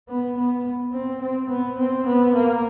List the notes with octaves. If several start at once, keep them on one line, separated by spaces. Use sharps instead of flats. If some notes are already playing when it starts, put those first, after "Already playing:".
B3
B3
C4
C4
B3
C4
B3
A#3